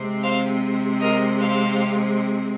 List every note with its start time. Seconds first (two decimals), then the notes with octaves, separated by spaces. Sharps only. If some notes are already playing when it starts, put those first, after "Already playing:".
Already playing: C3 G#3 C4
0.23 C5 F5
1.01 A#4 D#5
1.40 C5 F5